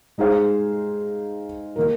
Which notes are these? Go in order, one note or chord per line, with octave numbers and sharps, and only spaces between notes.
G#3 D#4 G#4 C5 F5
D#3 A#3 D#4 A#4